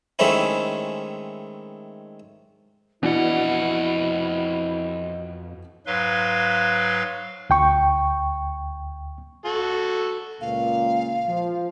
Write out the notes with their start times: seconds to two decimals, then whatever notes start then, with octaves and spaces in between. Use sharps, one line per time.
0.19 D#3 G#3 A3 C4 C#4 E4
3.03 F2 B2 E3 D4 E4 D#5 F#5
5.87 G#2 F#3 B4 F5 C6
7.50 D2 G5 C#6
9.45 F#4 A4
10.41 C#2 A#2 F5
11.27 F3